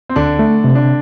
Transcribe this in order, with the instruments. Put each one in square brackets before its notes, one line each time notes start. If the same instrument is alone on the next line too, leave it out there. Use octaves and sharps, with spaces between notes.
[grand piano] C4
[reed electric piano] D2 [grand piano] D3 D4
[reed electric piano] A3
C3
[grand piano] D4